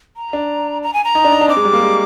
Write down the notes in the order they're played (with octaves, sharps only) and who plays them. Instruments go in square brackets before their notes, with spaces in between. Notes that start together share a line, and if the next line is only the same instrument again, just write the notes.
[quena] A#5
[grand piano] D4
[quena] A#5
G#5
A#5
[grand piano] D#4
D4
D#4
D4
[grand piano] C4 [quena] D6
[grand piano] G#3
G3
A#3
G#3